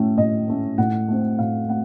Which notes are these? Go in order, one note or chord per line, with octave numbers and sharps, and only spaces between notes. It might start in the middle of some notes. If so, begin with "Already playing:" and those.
Already playing: A2 A3 C#4
A2 D#5
A3 C#4
A2 F#5
A3 C4
A2 F5
A3 C4 F#5